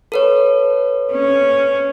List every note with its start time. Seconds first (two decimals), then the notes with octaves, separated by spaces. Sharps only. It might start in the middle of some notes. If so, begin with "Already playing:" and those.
0.12 A4 B4 C#5
1.12 C#4